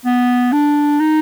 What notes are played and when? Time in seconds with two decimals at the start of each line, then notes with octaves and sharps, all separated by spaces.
0.06 B3
0.52 D4
1.00 D#4